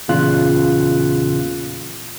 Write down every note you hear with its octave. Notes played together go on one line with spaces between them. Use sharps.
E2 A#2 C#3 F4 F#6